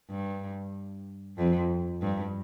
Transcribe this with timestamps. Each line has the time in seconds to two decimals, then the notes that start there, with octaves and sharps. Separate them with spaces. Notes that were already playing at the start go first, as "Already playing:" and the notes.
0.10 G2
1.37 F2
2.01 G2